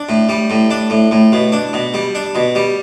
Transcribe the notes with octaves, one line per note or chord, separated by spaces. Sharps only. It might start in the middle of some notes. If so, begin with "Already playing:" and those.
Already playing: D4
A2
G3
A2
D4
A2
A2
B2
D4
B2
G3
D4
B2
G3